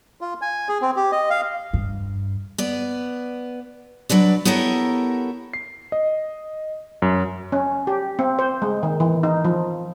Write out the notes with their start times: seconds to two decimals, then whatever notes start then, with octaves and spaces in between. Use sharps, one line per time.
0.21 F4
0.41 G#5
0.69 G#4
0.82 C4
0.96 G4
1.12 D#5
1.30 F5
1.73 G2
2.58 B3 D5
4.09 F#3 D4 B4 D5
4.45 B3 E4 G4 A4 A#4 C#5
5.53 C7
5.92 D#5
7.02 F#2
7.52 C#4
7.87 G4
8.19 C4
8.39 C5
8.62 G#3
8.83 D#3
9.00 E3
9.23 D#4
9.45 F3